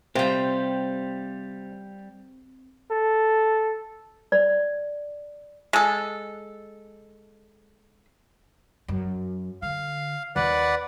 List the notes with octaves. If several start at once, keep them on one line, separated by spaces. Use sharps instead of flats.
C3 G3 C4 F4 G4 G5
A4
D5
G#3 A4
F#2
D3 F5
D#2 B4 D5 F#5